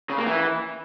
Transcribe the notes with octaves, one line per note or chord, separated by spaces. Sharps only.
C#3
A#3
E3